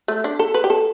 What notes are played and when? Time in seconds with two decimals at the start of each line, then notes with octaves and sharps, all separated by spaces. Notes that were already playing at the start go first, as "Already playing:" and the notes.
0.08 A3
0.24 D4
0.39 A4
0.54 B4
0.64 G4
0.70 A4